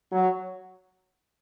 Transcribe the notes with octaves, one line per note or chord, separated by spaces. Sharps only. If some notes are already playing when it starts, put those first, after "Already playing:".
F#3